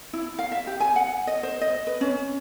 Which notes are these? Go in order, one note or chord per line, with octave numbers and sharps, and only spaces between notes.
E4
F5
E5
G4
G#5
F#5
D#5
C5
D#5
B4
C#4